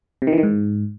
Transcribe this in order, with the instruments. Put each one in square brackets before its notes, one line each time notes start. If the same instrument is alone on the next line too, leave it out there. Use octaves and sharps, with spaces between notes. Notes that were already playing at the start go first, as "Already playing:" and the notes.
[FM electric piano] C3
D#3
E3
D#3
G#2